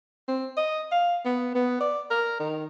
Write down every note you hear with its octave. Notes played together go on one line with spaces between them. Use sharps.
C4
D#5
F5
B3
B3
D5
A#4
D#3